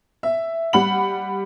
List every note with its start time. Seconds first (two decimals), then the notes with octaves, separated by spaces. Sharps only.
0.23 E5
0.73 G3 F#5 B5 F#7